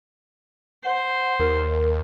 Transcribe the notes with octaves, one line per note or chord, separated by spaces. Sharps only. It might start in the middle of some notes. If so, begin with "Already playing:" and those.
C5 F#5
D#2 A#4